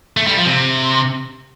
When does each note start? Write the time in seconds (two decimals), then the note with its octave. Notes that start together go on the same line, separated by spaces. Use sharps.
0.17 A3
0.27 G3
0.37 F3
0.46 C3